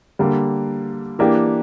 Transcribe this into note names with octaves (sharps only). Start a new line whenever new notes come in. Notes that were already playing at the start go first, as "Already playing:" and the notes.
D3 G3 A#3
E3 A#3 D4 G4